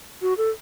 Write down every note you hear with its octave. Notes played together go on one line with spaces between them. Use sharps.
F#4
A4